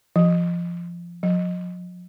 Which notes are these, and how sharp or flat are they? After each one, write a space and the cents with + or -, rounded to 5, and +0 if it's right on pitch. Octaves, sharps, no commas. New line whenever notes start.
F3 -15
F3 +45